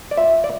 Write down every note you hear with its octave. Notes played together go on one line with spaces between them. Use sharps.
D5
F4 E5
D5